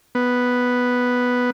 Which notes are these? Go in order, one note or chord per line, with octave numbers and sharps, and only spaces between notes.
B3